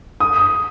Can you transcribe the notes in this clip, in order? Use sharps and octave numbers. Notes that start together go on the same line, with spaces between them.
D#6